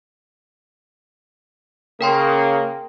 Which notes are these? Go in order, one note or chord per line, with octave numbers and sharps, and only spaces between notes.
C#3 A#3 A#4 G5 C6